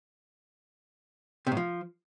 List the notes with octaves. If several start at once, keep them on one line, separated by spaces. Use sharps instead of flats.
C3
A2
F3